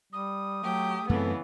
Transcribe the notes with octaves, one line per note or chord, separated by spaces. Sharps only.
G3 D#6
F#3 A3 G4
F#2 C#3 E3 A3 B3 C4 A4